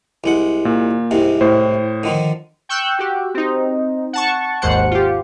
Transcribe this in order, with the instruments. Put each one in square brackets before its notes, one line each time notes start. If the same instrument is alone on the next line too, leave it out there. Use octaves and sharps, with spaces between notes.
[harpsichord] C2 G#3 F#5
[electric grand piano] A#2
[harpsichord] C2 G#2 C3
[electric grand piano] A2 C5
[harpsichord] D3 D#3 F3
[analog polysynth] G5 C#6 E6 F#6 G6
F#4 G4
C4 D#4
F#5 A5 C#6
G#1 D#2 G#2 C5 F#5 C#7
F4 G4